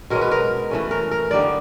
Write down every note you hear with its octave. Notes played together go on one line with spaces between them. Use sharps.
B2 G#3 C#4 A#4
B4
A#4
E3 A3 C#4
A#4
A#4
D3 G3 A#3 D#4 D5